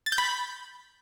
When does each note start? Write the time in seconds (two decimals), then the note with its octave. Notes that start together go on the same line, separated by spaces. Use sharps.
0.06 A6
0.12 G6
0.18 B5